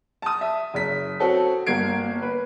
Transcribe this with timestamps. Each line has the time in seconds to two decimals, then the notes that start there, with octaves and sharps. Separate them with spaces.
0.22 A5 D#6
0.41 E5
0.74 F#1 B6
1.20 C4 F#4 A4 C#5
1.66 G1 A#3 G#6 C7 D7
2.22 B4